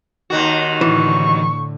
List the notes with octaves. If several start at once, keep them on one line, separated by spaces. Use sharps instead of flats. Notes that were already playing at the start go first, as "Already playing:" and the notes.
D#2 D#3 F#4
A2 D3 E3 C#6